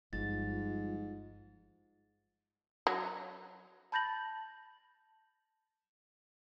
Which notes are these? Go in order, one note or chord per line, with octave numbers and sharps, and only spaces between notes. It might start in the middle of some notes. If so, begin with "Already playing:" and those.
G1 G#2 F3 G3 F4 A6
F#3
A5 B5 G6 A6 A#6 F#7